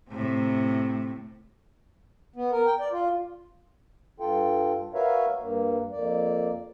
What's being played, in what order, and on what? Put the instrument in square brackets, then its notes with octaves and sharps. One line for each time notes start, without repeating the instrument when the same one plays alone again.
[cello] A2 C3
[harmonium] B3
A#4
G5
D5
F4
G2 F4 A4 G5
F#4 A#4 B4 C#5 E5 F5
G2 A#3
F2 A#3 D5